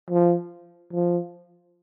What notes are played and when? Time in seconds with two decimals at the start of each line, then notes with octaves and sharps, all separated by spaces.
0.10 F3
0.93 F3